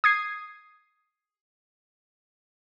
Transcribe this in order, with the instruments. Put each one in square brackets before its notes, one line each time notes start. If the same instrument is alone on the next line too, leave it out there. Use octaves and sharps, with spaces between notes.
[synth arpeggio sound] D#6 G#6 C7